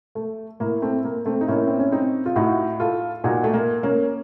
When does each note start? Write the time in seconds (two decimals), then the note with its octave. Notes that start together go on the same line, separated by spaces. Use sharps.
0.15 A3
0.60 A2 A#3
0.82 A3 C4
1.04 A#3
1.26 A3 C4
1.41 D#4
1.48 A2 A#3 C#4
1.67 C4
1.79 C#4
1.92 C4 D#4
2.26 F4
2.36 A2 D#4 F#4
2.80 F4 A4
3.24 A#2 D#4 F#4
3.44 A3
3.54 A#3
3.83 A#3 C#4